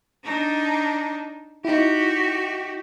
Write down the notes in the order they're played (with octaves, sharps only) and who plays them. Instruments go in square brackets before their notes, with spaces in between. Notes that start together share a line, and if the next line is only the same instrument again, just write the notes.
[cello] D4 D#4
[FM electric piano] D#4 E4 [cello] F#4 G4